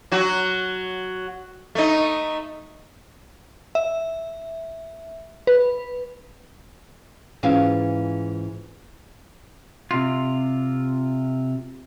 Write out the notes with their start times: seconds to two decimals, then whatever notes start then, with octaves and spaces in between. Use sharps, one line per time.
0.12 F#3 F#4
1.75 A3 D#4
3.75 E5
5.47 B4
7.43 G#2 E3 C#4 F4 F5
9.91 C3 F4